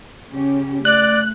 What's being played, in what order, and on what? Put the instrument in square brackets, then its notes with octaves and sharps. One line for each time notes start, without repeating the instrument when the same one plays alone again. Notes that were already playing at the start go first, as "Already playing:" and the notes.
[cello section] C#3 C#4 G4
[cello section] A3 [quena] D5 [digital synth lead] F#6